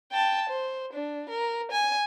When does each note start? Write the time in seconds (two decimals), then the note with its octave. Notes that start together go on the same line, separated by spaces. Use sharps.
0.12 G5 A5
0.49 C5
0.93 D4
1.30 A#4
1.71 G#5